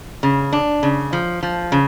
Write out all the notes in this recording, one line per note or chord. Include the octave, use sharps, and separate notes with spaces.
C#3
D4
C#3
F3
F3
C#3